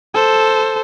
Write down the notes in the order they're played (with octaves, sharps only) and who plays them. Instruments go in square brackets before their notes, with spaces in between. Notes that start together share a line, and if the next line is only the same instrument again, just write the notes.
[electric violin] A4 C5